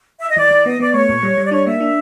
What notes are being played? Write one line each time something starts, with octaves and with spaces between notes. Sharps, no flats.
E5
D#5
E3 D5
E3
B3 D#5
B3 D5
A3 C#5
A#2
G3
G3
D5
D4 C#5
A#3 E5
D4